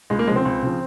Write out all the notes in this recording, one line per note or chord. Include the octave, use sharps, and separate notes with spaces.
C#2 G#3
A#3
C#3 F3 G#3 C4
C#2
C#3 F3